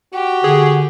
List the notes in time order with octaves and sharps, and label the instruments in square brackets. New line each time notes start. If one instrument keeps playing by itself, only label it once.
[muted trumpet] F#4 [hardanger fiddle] G4
[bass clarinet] D3 [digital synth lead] G#4